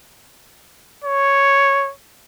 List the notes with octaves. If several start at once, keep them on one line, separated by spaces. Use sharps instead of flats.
C#5